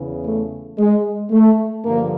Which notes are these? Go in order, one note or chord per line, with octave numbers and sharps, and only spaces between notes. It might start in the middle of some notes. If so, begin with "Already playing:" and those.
Already playing: E2 C#3 E3
A3
G#3
A3
G2 D3 F3 A#3